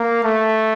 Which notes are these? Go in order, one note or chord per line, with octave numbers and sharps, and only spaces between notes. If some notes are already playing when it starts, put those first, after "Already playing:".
Already playing: A#3
A3